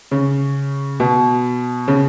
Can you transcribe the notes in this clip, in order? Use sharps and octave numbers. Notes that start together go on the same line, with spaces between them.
C#3
B2
C#3